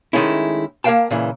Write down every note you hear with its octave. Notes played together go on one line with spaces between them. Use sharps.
D#3 G#3 A3 C#4 E4
A#3 A#4 B4 F5 G5 A5
A#2 C#3 E3